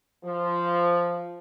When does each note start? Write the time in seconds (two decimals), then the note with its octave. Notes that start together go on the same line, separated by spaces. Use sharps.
0.24 F3